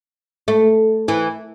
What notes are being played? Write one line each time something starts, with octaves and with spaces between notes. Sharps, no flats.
A3
E3